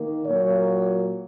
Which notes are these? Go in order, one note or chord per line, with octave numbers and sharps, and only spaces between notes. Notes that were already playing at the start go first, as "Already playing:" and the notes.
Already playing: D#3 A#3
A#2 F#3 A#3 C#5